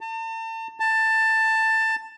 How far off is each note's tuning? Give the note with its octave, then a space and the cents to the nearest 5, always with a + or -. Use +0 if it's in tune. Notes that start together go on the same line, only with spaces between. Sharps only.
A5 +40
A5 +15